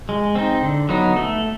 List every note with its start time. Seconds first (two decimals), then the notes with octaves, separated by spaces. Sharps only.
0.09 G#3
0.35 C4 D#4
0.62 D3
0.89 F#3 B3 D#4
1.16 A3